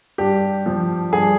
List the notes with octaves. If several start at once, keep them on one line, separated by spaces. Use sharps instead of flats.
G2 G4
F3
G2 G#4